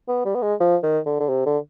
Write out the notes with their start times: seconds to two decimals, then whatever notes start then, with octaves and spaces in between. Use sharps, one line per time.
0.08 B3
0.25 G3
0.35 B3
0.42 G#3
0.60 F3
0.83 D#3
1.06 D3
1.20 D3
1.29 C3
1.46 D3